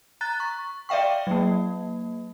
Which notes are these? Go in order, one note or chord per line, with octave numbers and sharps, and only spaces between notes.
A#5 F#6 A6
C#6
D5 E5 F5 G5 C#6
F#3 A#3